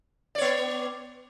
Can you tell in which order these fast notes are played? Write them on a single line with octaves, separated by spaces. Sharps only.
D5 C#5 B3